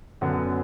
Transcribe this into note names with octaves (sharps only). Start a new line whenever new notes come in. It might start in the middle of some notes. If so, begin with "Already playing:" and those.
F#2 D3 F#3 B3